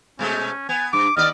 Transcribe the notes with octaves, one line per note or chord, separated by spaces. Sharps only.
B2 G#3 A3 C#4
B3 G#5
G2 D6
D#2 B3 D5 D#5 F6